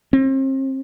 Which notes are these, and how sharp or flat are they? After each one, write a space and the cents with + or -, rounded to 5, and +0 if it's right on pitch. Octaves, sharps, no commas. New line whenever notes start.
C4 +40